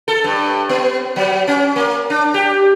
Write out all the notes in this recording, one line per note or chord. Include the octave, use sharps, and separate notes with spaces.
A4
G2
B3
F#3
C#4
A#3
D4
G4